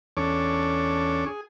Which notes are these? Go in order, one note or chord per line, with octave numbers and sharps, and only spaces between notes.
E2 C#4 D4 A4 C#5 D6
G#4